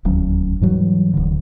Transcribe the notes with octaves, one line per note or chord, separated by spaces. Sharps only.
D#1 D2 F#3 C#4
G#2 E3 F#3 G3
D1 D3